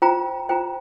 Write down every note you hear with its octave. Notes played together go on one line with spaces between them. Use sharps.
F4 C5 G5 A#5
F4 C5 G5 A#5